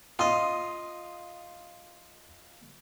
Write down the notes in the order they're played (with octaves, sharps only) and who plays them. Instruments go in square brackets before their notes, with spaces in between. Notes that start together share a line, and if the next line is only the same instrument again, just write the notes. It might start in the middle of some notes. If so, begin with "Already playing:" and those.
[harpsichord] F4 D#5 [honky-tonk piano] C6 D#6